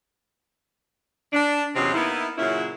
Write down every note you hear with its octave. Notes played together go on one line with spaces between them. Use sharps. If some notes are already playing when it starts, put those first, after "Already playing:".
D4
E2 C3 F#3 C4 C#4 D#5
A#3 B3 D#4 E4
A#2 C#3 F#3 C#4 E4 E5